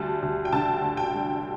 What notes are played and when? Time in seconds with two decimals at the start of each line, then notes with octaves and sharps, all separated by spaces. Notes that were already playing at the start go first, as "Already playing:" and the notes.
Already playing: D2 G3 A5
0.22 D2
0.45 G5
0.53 D3 A5
0.82 D2
0.97 G5
1.13 G3